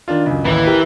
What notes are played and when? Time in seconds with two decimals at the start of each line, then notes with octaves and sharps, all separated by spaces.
0.08 D#3 D4 F4
0.26 C#2 F#2
0.45 A1 D#2 E3
0.67 G4 A#4